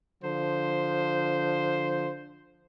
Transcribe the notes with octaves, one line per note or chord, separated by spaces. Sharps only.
D3 F3 C5